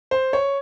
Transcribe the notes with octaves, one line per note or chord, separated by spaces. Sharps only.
C5
C#5